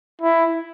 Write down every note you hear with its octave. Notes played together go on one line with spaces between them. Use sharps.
E4